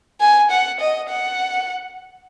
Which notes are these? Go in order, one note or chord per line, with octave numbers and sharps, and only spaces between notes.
G#5
F#5
D#5
F#5